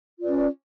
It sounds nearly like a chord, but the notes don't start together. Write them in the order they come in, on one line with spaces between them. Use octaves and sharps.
F4 D5 B4 C#4